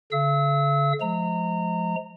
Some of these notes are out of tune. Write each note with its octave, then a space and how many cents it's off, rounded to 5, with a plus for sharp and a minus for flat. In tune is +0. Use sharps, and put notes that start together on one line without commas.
D3 -45 F5 -45 E6 -30
F3 +0 G#3 +35 A#5 -25